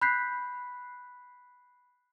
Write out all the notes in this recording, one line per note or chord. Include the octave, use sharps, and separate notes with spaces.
B5 F#6 G6 B6 C7